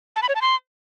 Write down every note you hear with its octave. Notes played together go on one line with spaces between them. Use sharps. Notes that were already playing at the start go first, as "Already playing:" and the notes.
A5
B5
C#5
A5
C6